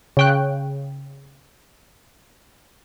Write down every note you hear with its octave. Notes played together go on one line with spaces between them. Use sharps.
C#3 G5 F#6